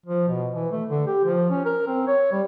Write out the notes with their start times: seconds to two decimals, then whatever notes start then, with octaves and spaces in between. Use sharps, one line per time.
0.06 F3
0.28 B2
0.53 E3
0.72 A3
0.89 D3
1.06 G4
1.24 F3
1.50 C#4
1.65 A#4
1.87 C4
2.07 C#5
2.32 G3